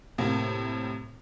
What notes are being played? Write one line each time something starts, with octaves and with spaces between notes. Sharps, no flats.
A2 C3 A#3